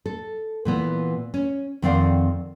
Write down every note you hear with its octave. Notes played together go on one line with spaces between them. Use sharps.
A4
A#2 E3 B3
C#4
F2 D#3 C4 D5 F5 F#5